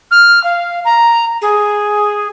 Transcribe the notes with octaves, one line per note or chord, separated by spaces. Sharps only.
F6
F5
A#5
G#4